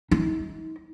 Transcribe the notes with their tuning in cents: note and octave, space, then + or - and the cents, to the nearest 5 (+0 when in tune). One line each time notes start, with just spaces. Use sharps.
D#4 +40